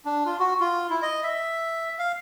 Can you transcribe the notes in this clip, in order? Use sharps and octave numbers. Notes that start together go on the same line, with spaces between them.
D4
F4
F#4
F4
E4
D#5
E5
F5